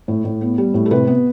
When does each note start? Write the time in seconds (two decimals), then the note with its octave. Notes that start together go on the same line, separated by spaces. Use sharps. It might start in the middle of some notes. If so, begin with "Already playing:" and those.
0.08 A2
0.25 A2
0.41 B3
0.58 G3
0.74 A2
0.86 A4
0.91 C3 B4
1.07 B3